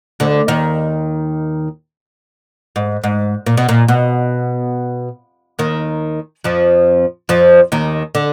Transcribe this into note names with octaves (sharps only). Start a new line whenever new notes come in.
D2 D3
D#2 D#3
G#2
G#2
A#2
B2
A#2
B2
D#2 D#3
F2 F3
F2 F3
D#2 D#3
D3